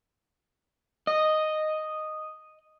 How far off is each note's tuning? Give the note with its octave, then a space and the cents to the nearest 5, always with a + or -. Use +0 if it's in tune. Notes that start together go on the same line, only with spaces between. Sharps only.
D#5 -5